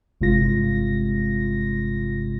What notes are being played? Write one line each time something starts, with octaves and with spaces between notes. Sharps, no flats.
G1 C3 G#3 F4 A#6